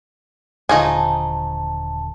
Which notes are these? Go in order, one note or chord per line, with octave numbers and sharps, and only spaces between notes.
D#1 D3 F3 A3 D#4 G#4 G#5 A5